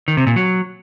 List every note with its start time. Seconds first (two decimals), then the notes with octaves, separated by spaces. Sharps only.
0.08 D#3
0.17 C3
0.27 A#2
0.36 F#3